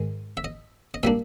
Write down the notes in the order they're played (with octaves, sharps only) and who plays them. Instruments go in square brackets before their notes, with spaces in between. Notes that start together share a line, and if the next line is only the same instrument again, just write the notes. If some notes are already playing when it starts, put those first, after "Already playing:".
Already playing: [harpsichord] G#2 D#3 G#3
E5
D#5
D#5
A#2 G3 A#3 D4 E5